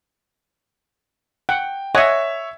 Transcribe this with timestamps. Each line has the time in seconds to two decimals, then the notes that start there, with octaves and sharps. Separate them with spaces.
1.49 F#5 G5
1.95 C#5 D#5 E5 F#5 G#5